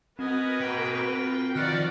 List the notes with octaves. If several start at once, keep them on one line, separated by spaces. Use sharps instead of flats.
B3 C4 F#4 A#4 B4 D#5 G#5
G#2 B2 A#3 G5
F4
D#3 F3 F#4 D5 F#5 F6 F#6